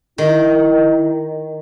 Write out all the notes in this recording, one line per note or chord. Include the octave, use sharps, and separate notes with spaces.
D#3 E4